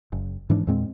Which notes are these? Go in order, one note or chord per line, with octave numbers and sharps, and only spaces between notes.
F#1
G#2 E3 D4
E2 A#2 G#3 C4